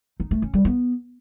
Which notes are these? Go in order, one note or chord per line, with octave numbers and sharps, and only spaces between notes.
D#4
A3
C#4
G3
B3